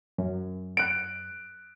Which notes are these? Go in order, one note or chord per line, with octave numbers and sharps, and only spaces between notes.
F#2
F#6 D7